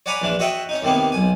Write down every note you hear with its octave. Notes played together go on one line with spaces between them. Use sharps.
C#5 D5 F#5 G#5 A#5 B5
A#1 E3 D4
F#4 C#5 D#5 E5 F#5 G5
C#4 D#4
D#2 C3 D#3 A#3 B3
B1 G#5